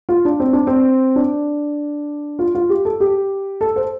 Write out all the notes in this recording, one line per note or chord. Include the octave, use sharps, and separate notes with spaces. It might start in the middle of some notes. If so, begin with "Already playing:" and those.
F4
D4
C4
D4
C4
D4
F4
F4
G4
A4
G4
A4
C5